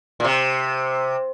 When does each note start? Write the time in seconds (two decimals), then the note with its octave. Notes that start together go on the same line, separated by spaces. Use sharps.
0.20 A#2
0.24 C3